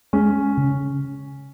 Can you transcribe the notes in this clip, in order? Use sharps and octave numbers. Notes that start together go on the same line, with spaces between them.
G#3 C#4
C#3